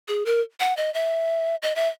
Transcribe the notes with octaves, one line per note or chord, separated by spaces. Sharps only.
G#4
A#4
F#5
D#5
E5
D#5
E5